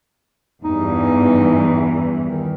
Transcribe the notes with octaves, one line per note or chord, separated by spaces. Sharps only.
E2 G2 E3 D#4
D#3